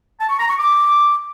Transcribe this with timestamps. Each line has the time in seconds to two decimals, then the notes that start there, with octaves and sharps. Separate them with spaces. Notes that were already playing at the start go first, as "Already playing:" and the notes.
0.20 A5
0.30 C#6
0.39 A#5
0.49 C#6
0.58 D6